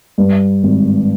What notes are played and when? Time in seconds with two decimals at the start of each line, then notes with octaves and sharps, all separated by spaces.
0.18 G2
0.63 G#1